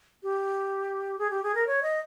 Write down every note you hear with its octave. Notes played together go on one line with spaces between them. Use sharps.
G4
G#4
G4
G#4
A#4
C#5
D#5